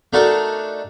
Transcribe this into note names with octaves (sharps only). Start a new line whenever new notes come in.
A3 D4 D#4 F#4 A4 A#4